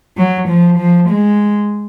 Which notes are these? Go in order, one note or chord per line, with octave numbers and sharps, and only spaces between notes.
F#3
F3
F3
G#3